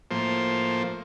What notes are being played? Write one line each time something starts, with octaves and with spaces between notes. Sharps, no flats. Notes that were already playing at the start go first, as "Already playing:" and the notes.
A2 F3 A#3 C5